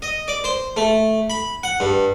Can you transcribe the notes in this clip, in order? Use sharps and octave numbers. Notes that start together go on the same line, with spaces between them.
D#5
D5
C5
A3
B5
F#5
G2